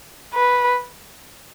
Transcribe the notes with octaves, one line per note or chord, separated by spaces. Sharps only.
B4